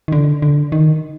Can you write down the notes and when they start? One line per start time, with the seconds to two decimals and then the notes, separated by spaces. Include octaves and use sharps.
0.08 D#3
0.12 D3
0.42 D3
0.72 D#3